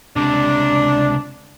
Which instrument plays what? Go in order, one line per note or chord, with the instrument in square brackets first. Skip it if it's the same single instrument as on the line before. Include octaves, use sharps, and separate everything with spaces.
[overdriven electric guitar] C#2 C3 [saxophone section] D4